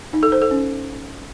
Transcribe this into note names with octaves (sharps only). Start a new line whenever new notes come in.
D#4
A4
C5
A4
C#4